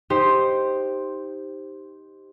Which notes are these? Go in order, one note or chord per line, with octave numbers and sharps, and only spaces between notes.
D#4 G4 C5